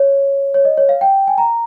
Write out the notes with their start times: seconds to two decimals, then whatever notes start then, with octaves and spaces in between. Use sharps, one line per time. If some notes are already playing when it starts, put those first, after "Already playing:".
Already playing: C#5
0.54 C#5
0.65 D#5
0.77 C#5
0.89 F5
1.01 G5
1.28 G#5
1.38 A#5